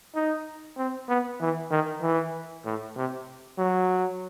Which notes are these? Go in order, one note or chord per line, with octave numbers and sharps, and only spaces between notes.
D#4
C4
B3
E3
D#3
E3
A2
C3
F#3